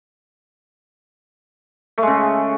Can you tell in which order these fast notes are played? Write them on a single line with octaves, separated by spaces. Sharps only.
A3 G#3 C#3